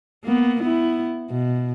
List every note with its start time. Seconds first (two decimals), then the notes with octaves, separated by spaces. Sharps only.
0.24 A#3 B3
0.62 B3 E4
1.30 B2